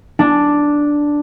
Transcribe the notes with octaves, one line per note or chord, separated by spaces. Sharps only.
D4